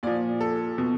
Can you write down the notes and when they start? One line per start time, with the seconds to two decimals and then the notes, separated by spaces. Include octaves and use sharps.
0.03 A#2 F3 D5
0.41 A4
0.78 B2